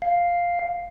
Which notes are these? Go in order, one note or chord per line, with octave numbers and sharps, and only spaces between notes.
F5